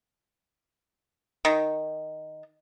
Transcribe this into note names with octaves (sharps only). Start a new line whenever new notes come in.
D#3